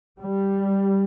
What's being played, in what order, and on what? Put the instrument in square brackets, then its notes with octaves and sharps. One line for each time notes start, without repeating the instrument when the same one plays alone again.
[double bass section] G3